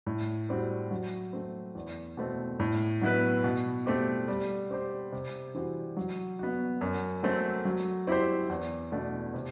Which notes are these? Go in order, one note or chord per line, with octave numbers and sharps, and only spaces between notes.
A2
G3 C4 F#4
F#3
A3 C4
E2
B2 A3 C4
A2
F#3 B3 E4 B4
B2
A3 C4 G4
G3
C4 G4 C5
C3
E3 G3 C4 F#4
F#3
B3 F#4
F#2
F#3 A3 C4
F#3
C4 E4 G4 C5
E2
B2 A3 D4
C3